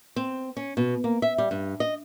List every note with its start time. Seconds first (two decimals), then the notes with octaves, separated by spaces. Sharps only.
0.16 C4
0.57 C#4
0.77 B2
1.04 A#3
1.22 E5
1.38 G3
1.51 G2
1.80 D#5